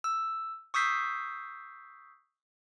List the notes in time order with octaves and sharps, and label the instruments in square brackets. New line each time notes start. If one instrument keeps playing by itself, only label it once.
[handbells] E6
C#6 D#6 E6 G6 B6 C7